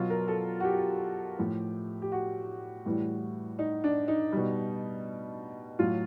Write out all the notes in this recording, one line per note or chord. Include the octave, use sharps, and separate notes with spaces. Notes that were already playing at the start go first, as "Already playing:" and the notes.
Already playing: B2 F#3 F4
A#4
A4
F#4
G4
A2 F3
G4
F#4
A2 E3 G3
D#4
D4
D#4
B2 G3
A2 F#3 F4